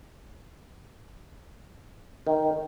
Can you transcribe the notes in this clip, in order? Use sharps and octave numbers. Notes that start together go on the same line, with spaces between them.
D#3